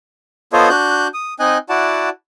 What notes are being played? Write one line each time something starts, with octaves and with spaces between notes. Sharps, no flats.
B3 F4 A4 C5 C#5 D#5
D4 F#4 F#6 G6
D#6
C4 D#4 D#5 G#5 F#6
E4 F#4 D5 F#5 A5